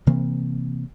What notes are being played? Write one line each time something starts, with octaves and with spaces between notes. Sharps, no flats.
C3 E3 A#3 C4